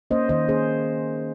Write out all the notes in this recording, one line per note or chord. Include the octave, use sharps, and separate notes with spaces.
A#3 C#4 C5 D#5
D#3 C5 D#5
A#3 C#4 G#4 C5